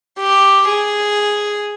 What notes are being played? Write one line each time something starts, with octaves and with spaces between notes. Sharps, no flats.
G4
G#4